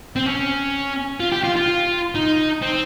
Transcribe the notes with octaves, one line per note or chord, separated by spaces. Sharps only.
C4
C#4
F4
G4
F4
F4
D#4
C4